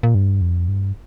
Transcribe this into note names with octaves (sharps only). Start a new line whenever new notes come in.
A#2
G2
F2
G2